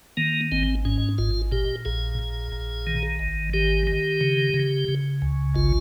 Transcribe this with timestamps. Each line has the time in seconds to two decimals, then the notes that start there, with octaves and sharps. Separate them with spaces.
0.17 D#3 A#3
0.52 G#1 C4
0.85 G#2 C#4
1.18 G#1 F4
1.52 A#2 G4
1.85 A#1 G#4
2.19 A#2
2.52 A#1
2.87 D#3
3.19 G#1
3.53 D#3 G4
3.87 D#3
4.21 C#3
4.54 C#3
4.88 C#3
5.22 C#2
5.54 G#1 F4